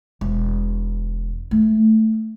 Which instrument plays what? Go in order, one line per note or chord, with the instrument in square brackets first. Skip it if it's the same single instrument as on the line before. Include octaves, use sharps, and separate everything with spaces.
[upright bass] E1
A3